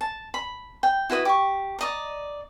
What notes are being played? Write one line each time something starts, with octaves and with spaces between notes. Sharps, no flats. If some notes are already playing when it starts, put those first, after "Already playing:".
A5
B5
G5
E4 F#4 B4 D#5
G4 C#6
D5 D#5 A#5